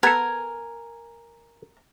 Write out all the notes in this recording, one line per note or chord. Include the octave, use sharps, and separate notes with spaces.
B3 A4 A#4 G#5